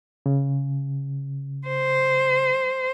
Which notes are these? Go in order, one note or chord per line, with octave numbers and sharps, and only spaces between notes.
C#3
C5